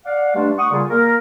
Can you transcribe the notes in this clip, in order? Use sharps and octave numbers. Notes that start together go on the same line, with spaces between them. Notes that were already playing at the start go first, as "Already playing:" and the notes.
D5 F5 F#5
G2 G#3 A3 D4
F#5 C#6 D#6
A#2 C#3 G3 F4 G#4
A#3 A#4